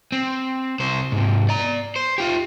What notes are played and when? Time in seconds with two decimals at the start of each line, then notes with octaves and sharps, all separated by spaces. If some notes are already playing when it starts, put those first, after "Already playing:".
0.12 C4
0.80 C2 C5
1.12 G#2 C3
1.49 D5 A#5
1.96 C5
2.18 F4 G4